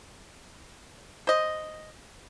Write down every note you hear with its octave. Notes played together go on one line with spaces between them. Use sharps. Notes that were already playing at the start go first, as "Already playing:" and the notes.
C5 D#5